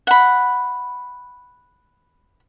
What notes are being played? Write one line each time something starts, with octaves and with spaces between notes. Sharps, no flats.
F#5 B5